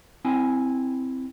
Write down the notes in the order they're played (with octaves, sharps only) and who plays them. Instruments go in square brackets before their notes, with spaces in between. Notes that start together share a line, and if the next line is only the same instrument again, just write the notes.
[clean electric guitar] C4 E4 G#5